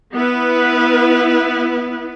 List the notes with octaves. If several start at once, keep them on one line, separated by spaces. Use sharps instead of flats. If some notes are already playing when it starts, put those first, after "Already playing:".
B3 E4 B4